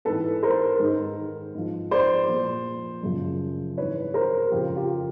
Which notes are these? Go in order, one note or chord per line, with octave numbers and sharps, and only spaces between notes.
G#2 E3 A4 B4
A#4 C5
G#2 D#3
G#2 F3
C5 D5
A#2 F3
F#2 C#3 F3
G#2 E3 B4 C#5
A#4 C5
F2 C#3 F3 F4 G4
F4 G4